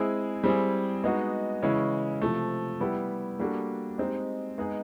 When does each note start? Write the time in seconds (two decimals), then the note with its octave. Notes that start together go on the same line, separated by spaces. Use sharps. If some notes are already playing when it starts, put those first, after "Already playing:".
Already playing: G#3 C4 E4 G#4
0.44 G3 C4 E4 G#4
1.04 G#3 B3 D#4 F#4
1.62 C#3 E3 G#3 C#4 E4
2.21 C3 F3 A3
2.80 G3 B3 E4 G4
3.39 G3 A#3 D4 F#4 A4
3.98 G#3 C4 D#4 G4
4.58 G#3 B3 D#4 G#4